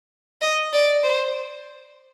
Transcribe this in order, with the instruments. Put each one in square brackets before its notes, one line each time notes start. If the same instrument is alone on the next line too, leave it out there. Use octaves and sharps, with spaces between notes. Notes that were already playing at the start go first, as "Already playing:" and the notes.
[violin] D#5
D5
C5